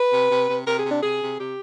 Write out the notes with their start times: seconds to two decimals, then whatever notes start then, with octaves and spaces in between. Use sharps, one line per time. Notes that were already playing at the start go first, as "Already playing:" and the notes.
Already playing: B4
0.11 C3
0.29 C3
0.48 C3
0.66 C3 A#4
0.78 G#4
0.84 C3
0.90 D4
1.02 C3 G#4
1.20 C3
1.38 C3 G4